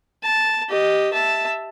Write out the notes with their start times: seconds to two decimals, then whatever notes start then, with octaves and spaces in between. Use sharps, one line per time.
0.23 A5
0.69 G4 D#5
1.13 E5 A5